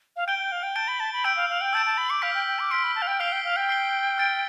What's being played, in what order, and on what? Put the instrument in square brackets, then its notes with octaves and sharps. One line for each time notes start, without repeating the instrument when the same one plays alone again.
[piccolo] F5
[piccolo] G5 [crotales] G6 D7 G7
[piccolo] G5
F5
G5
[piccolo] A5 [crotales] G6 D7 G7
[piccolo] B5
A5
B5
[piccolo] G5 [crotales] E6 G6 D7
[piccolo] F5
F5
G5
[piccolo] A5 [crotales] E6 G6 D7
[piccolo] A5
B5
D6
[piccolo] F5 [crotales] F6 B6 D7
[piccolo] G5
G5
D6
[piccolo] C6 [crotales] F6 B6 D7
[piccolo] B5
A5
F5
G5
[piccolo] F5 [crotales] F6 C7 G7
[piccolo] G5
F5
G5
[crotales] F6 C7 G7
F6 A6 D7